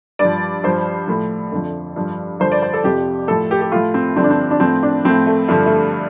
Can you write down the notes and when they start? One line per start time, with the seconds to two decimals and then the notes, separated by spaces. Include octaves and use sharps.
0.19 G2 D5
0.25 F3
0.63 G2 F3 C5
1.07 A2 F3
1.52 F2 D3 F3
1.96 G2 F3
2.40 G2 D3 F3 C5
2.52 D5
2.63 C5
2.73 A4
2.84 F2 C3 F3 G4
3.28 A2 F3 A4
3.51 G4
3.61 G4
3.72 A2 F3 F4
3.94 C4
4.17 G2 D3 F3 C4
4.24 D4
4.30 C4
4.51 D4
4.60 A2 F3 C4
4.83 D4
5.05 A2 F3 C4
5.26 A3
5.48 G2 D3 F3 A3
5.66 A3